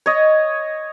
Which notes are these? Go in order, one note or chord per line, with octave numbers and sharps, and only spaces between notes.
C#5 D#5